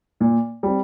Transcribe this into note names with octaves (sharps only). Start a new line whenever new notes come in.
A#2
G3 C4